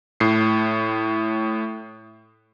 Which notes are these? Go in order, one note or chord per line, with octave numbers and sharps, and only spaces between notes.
A2 C7